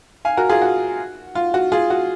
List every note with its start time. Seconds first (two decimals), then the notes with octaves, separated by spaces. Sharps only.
0.25 F5 G#5
0.37 F#4 A#4
0.49 F4 G#4
0.62 F#4
1.35 F4
1.54 F#4
1.72 F4 G#4
1.90 F#4